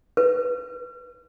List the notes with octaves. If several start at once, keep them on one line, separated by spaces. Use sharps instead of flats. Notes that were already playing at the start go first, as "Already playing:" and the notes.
B4